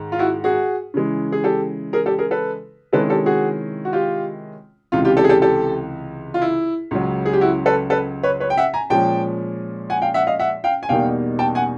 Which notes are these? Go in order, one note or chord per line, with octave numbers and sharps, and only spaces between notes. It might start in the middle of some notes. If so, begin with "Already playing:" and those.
Already playing: G#2 D#3
F4
E4 F#4
F#4 G#4
C#3 E3 G#3
G#4
G4 A4
G#4 A#4
G4 A4
G#4 A#4
A4 B4
C3 D#3 G#3 C#4 E4 A4 B4
G4 A4
F#4 G#4
F#4
F4 G4
C#2 C3 E3 F4
F4 G4
G4 A4
G#4
G4 A4
G4 A4
F4
E4
C#2 C#3 F#3
G#4
G4
E4 F#4
A4 B4
A4 B4
B4 C#5
B4 C#5
G5
E5 F#5
G#5 A#5
A#2 F3 G#3 C#4 G5 A5
F#5 G#5
F5 G5
E5 F#5
D#5 F5
E5 F#5
F5 G5
G#5
E2 B2 G3 A#3 D#4 F5 G5
G5 A5
F#5 G#5